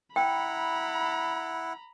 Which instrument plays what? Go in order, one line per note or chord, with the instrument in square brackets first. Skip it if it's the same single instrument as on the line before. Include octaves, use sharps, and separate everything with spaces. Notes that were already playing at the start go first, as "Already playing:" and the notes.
[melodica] E4 F#5 [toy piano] G5 [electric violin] A#5 B5